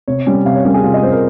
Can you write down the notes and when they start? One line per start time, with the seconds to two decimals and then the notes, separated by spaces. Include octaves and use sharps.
0.08 C3 C#5
0.26 G3 C#4
0.45 C3 F5
0.55 C#5
0.65 G3 C#4 A#4
0.74 G#4
0.83 C3 F4
0.94 D#5
1.03 G3 C#4 C5
1.12 A#4